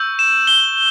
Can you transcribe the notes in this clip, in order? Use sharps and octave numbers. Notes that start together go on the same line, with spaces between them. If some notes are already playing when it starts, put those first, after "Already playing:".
Already playing: C#6 E6 G6
E7
G7